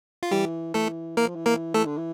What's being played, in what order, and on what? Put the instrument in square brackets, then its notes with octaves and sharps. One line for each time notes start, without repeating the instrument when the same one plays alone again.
[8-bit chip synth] F4
[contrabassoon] E3 [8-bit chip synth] G3 G4
[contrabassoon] E3 [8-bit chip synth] A3 A4
[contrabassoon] E3 [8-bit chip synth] A#3 A#4
[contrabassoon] F3
E3
[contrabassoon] E3 [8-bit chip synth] A#3 A#4
[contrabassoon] E3 [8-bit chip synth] A3 A4
[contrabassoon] D3
E3